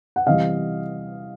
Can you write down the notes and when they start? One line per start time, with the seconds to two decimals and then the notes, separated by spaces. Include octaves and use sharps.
0.16 F#5
0.27 C3 E3 G3 D#5 F5